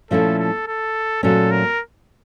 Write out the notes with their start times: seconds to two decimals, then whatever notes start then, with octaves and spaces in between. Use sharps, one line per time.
0.11 A#2 F3 A3 C#4 E4 A4
0.38 A4
0.67 A4
1.23 A#2 F#3 A3 C#4 A4
1.51 A#4